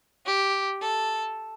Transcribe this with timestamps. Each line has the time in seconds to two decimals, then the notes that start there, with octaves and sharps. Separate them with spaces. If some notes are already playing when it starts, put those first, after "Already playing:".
0.26 G4
0.81 A4